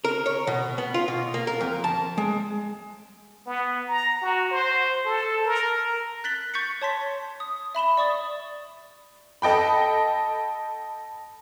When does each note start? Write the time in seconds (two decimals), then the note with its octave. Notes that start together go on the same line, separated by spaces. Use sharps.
0.04 A#4
0.26 C#5
0.47 B2
0.78 B3
0.94 F4
1.08 B2
1.34 A#3
1.47 A#4
1.61 F2
1.84 A5
2.18 G#3
3.46 B3
3.88 A#5
4.22 F#4
4.51 C5
5.05 A4
5.45 A#4
6.24 F#6 A6 B6 F#7 G7
6.54 C#6 G6 A6 B6 C#7
6.82 C#5 A5 C6 B6
7.40 D#6
7.75 E5 B5 E7 G7
7.97 D5 C#6 D#6 A6
9.42 A4 D#5 G5 B5